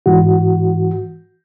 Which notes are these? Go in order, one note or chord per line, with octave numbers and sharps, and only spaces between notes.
G#2 E3 F#4